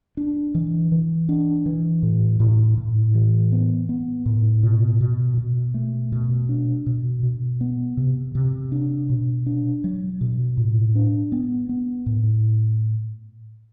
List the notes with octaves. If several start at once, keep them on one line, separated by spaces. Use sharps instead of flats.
D4
E3
E3
D4
E3
A2
A2
A2
E3
B3
B3
A2
B2
B2
B2
A3
B2
D4
B2
B2
B3
C3
C3
D4
B2
D4
F#3
B2
A2
D4
B3
B3
A2